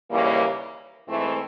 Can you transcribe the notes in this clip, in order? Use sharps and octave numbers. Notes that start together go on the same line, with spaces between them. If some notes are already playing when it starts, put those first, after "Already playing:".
D#2 C#3 E3 G3 A#3
G#2 E3 A3 C4